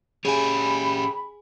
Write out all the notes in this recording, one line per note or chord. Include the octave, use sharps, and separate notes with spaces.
C#4 G4 G#4 C#5 G#5 B5